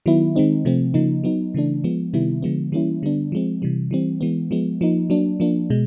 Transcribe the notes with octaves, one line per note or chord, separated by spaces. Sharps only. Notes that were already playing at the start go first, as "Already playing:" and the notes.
D#3 F#3 B3 E4
D#3 G#3 C4 D#4
C3 F3 A3 C4
C#3 F3 A#3 D#4
F#3 B3 D#4
C#3 E3 A3 D4
F3 G#3 B3
C3 D#3 G3 B3 E4
D3 F3 G#3 B3
E3 G3 A#3 C#4 E4
D3 G3 B3 D4
F3 G#3 C4
C3 E3 G3
E3 G3 C4
E3 G#3 B3
F3 G#3 B3
F3 A#3 D#4
F#3 A#3 D4
F3 A#3 D4
B2 G#3